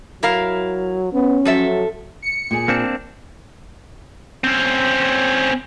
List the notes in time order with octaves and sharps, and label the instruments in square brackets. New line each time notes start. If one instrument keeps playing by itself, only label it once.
[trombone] F#3 [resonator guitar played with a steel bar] E4 A#4 F5
[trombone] B3 [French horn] C#4
[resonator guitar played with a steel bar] F3 A4 E5 [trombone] F#3
[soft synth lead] C#7
[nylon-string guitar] A#2 G#4
[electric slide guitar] A#3 C4 D4
[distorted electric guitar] C4 C#4